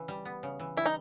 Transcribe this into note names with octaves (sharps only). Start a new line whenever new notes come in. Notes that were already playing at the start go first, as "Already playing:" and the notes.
Already playing: C#3 E3
G3
B3
C#3
E3
G3 E4
D#4